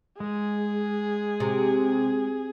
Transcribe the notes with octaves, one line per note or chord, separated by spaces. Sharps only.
G#3 G#4
C3